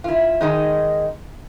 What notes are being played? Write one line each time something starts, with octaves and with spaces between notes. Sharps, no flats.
E4 F4
D#3 G#3 D#4